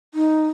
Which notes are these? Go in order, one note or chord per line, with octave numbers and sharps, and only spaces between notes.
D#4